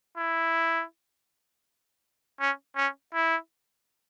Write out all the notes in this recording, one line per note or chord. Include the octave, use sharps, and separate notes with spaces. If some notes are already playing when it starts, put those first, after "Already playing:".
E4
C#4
C#4
E4